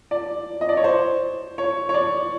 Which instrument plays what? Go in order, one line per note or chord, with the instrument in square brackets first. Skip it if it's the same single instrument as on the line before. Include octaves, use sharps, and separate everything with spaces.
[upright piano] D5
D#5
D5
C#5
C5
C#5
C#5
D5